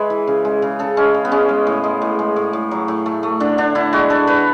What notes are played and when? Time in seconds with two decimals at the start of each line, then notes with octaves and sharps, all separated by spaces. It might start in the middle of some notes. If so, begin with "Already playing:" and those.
Already playing: G#3 B4 C#5 E5
0.10 E3
0.27 C#3
0.45 G#3
0.62 C#3
0.79 C#3 A4
0.97 G#3 C#4
1.14 C#3
1.25 B3
1.32 G#3 C#4
1.49 G#3
1.67 A2
1.84 G#3
2.02 A2
2.19 G#3
2.36 A2
2.53 A2
2.71 F#3
2.88 A2
3.06 A3
3.23 A3
3.40 D3 D4
3.58 D3 D4
3.75 D3 E4
3.93 G#3 F#4
4.10 D3 A4
4.27 D3 B4